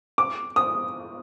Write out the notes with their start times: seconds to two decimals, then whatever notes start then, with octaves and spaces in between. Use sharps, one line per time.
0.18 D6
0.56 D#6